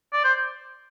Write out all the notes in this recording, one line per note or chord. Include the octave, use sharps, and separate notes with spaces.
D5
C5